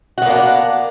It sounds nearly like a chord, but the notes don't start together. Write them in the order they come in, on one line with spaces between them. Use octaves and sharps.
F#4 B3 A#3 D4